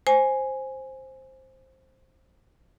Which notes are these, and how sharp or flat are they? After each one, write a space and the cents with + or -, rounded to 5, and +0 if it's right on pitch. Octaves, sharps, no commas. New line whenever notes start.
C5 +10 G#5 +0